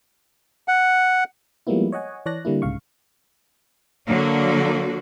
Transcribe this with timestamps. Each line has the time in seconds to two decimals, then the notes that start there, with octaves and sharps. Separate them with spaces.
0.68 F#5
1.67 F3 G3 G#3 A#3 B3 E4
1.92 C#5 D#5 F#5 G#5
2.26 E3 C#5 D5 A5 F#6 A#6
2.45 D3 G3 A#3 E4
2.62 C2 G#2 C#3 F5 C#6
4.06 D3 F#3 A#3 F#4